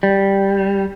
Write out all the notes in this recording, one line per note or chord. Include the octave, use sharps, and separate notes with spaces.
G3